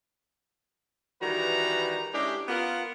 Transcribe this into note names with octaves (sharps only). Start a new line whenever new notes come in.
D#3 E3 G3 F#4 B4 A#5
G#3 C#4 D4 E4 G4
B3 F4 A#4 F#5